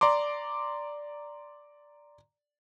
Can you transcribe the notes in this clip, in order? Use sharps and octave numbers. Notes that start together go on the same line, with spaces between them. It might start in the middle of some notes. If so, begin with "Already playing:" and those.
D5 A#5 C6 D6